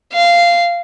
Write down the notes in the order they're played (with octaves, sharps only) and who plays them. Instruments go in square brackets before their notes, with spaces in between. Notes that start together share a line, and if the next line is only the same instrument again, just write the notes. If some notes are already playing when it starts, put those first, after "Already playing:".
[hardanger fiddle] F5